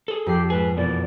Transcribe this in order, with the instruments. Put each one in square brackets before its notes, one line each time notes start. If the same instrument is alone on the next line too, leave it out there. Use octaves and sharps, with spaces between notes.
[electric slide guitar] G#4 A4
[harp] F2 C7 [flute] G4
[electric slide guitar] G#2 G#4 [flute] B4
[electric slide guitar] F#2 B2 E3 [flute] D5